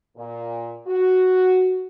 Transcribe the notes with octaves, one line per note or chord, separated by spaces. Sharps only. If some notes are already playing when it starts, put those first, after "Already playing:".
A#2
F#4